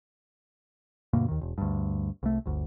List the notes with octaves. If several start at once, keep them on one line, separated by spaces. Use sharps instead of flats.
D2 G2 B2 A#3
D#2 D#3
E1
D2 G2
C2 A3
G1 D2